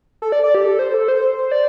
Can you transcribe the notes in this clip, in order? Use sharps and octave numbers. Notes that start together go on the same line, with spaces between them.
A4
D5
D5
G4
A4
C5
A4
C5
D5